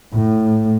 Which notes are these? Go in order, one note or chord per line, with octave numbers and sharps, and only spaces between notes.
A2